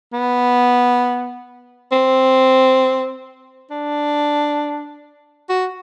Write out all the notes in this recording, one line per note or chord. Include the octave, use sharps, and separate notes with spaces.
B3
C4
D4
F#4